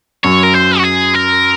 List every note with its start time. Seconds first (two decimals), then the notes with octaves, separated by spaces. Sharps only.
0.24 F#2 C#5
0.43 A#4
0.54 C5
0.78 F#4
0.84 G#4
1.15 A#4